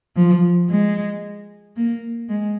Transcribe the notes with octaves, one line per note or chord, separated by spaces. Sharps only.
F3
G#3
A#3
G#3